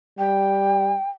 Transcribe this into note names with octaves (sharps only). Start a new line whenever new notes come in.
G3 G5